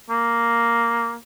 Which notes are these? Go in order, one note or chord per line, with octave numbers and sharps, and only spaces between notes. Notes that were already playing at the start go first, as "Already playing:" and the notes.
A#3